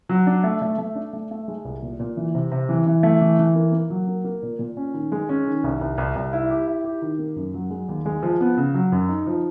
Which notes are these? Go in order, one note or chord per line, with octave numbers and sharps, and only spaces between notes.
F#3
D4
A3
A3
A3
D4
A3
A3
G#3
C2
A#2
A#2
E3
C3
C3
E3
E3
A3
E3
E3
A#3
A#3
F#3
A#3
A#3
A#2
A#2
C#4
D#3
G#3
C#4
D#3
C2
C2
C2
C2
E4
G4
E4
G4
D#3
A#3
F#2
F#3
G#3
D#2
G#3
F3
B3
C#3
F#3
F#2
D#4
F3